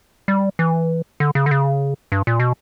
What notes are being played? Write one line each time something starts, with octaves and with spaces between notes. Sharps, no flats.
G3
E3
D3
C#3
D3
C#3
G2
A#2
B2